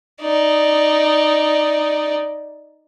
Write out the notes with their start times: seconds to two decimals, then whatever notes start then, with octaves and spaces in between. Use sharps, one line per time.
0.21 D#4 D5